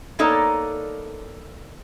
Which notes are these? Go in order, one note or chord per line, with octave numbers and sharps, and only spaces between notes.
A#3 B3 D#4 A4 C#5 D5